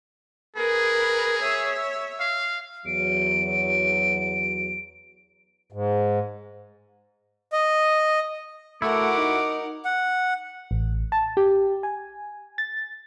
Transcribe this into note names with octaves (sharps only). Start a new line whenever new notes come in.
G#4 A#4 B4
C#5 E5
F5
E2 F#3 D7
G#2
D#5
A3 E4 F#4 A#4 F#5 D6
D#4
F#5
A1
A5
G4
G#5
A6